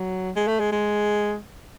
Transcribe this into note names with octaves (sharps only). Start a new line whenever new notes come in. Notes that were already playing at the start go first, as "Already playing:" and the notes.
Already playing: F#3
G#3
A3
G#3
G#3